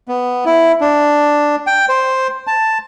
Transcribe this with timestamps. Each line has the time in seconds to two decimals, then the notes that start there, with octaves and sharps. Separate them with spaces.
0.08 B3
0.45 E4
0.81 D4
1.67 G5
1.89 C5
2.47 A5